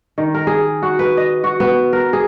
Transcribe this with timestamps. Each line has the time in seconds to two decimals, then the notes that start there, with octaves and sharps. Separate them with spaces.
0.18 D#3
0.34 A#4
0.47 G#4
0.82 F#4
0.99 B4
1.17 D#5
1.44 F#4
1.60 B3
1.93 A#4
2.13 G#4